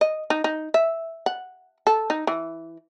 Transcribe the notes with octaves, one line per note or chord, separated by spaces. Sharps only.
D#5
D#4
D#4
E5
F#5
A4
D#4
E3